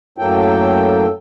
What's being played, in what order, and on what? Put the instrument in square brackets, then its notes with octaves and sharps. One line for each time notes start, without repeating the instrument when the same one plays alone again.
[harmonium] F#2 A2 F#3 A#3 A4 G5